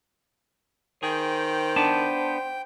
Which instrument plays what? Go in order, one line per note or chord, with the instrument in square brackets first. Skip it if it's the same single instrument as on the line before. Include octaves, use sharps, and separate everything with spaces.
[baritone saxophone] D#3 [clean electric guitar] G#4 [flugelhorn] C5 [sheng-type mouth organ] G5
[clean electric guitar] B3 D4 A5